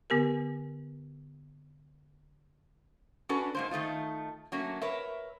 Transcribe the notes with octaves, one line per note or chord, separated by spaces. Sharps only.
D3 B3 G4 A#4
C#4 D4 F#4 A4 B4
G#2 A#3 C5
D#3 A3 D#4 F4
F#3 A3 A#3 C#4
A#4 B4 C#5 E5